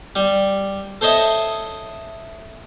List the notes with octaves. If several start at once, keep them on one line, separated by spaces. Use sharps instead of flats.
G3
A4 C5 C#5 D#5 E5 A5